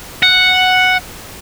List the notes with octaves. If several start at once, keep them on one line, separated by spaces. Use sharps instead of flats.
F#5